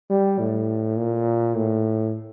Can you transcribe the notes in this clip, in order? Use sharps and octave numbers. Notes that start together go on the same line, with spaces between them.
G3
A2
A#2
A2